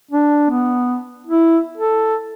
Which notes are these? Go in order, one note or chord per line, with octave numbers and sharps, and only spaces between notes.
D4
B3
E4
A4